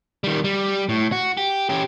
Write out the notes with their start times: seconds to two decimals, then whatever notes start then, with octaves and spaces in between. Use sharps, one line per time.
0.24 D#3 G3
0.44 G3
0.89 A2
1.12 F#4
1.37 G4
1.69 C#4 G4